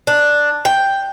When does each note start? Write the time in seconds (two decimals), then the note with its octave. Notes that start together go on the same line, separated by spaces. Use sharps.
0.07 D4
0.65 G5